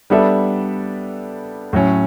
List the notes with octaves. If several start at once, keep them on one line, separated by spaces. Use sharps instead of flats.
G3 B3 D4 A4 E5
A2 F#3 C#4